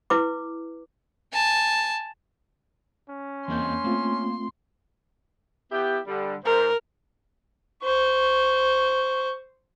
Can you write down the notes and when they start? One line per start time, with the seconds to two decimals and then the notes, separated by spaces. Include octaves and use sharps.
0.10 E4 B4 D6
1.33 G#5 A5
3.09 C#4
3.48 E2 E3 A#3 C4 D#5 C6 G6
3.84 A3 A#3 C4 F4
5.71 B3 E4 G4
6.07 D3 G3
6.45 G#2 A#4 C5
7.84 C5 C#6